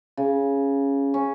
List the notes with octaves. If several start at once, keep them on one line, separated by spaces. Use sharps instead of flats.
C#3
C#4